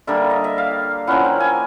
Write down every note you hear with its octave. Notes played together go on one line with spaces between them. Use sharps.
D3 G3 A#3 E5
D#5
E5
F5
F3 A#3 C#4 E4 F#5
G5
G#5